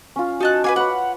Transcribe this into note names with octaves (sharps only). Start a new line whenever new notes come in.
C#4 F4
D#4 F#4 D#5 A5 F#6
B4 F5 G#5 D6
B4 C#5 F#5 B5